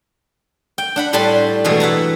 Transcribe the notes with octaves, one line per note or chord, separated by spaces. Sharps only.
G5
D4 F#5 B5
A2 G3 D4 A5 B5 C6
B2 E3 G#3 A3
E5 F#5 A5 A#5